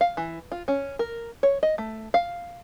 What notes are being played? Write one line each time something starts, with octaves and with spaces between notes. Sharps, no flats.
F5
E3
F4
C#4
A#4
C#5
D#5
A3
F5